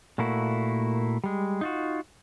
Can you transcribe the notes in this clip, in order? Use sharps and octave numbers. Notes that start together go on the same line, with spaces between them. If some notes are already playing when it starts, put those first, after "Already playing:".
A#2 A3 A#3 E4 F#4
G3 G#3
D#4 F4 F#4